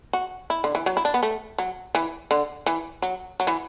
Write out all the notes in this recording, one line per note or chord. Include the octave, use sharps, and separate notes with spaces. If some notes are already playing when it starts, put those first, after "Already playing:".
F#4
E4
D3
E3
F#3
E4
D4
B3
A3
F#3
E3
D3
E3
F#3
F#3
E3